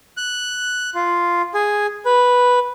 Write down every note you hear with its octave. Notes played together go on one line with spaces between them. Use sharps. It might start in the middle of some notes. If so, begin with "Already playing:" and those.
F#6
F4
G#4
B4